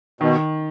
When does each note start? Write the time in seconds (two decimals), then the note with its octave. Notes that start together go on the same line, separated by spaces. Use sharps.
0.21 B2 D#3